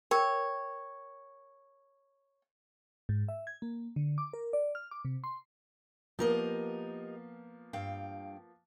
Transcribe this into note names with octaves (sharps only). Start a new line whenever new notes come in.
A#4 C#5 G5
G#2
E5
G#6
A#3
D3
D6
A#4
D5
F6
D6
C3
C6
F3 A#3 B3 G4 A#4 D#5
G2 F5 G5